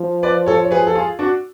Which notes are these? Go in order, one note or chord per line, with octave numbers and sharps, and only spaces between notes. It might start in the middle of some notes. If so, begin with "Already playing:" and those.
Already playing: F3
B4 D5
A4 C#5
C#5
G#4 B4
A4
F4 G#4
D4 F#4